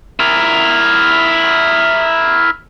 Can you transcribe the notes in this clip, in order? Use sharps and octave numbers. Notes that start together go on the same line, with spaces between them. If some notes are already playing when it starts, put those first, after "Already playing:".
E4 A#4